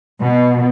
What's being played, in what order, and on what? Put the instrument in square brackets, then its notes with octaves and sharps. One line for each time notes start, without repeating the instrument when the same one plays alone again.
[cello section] B2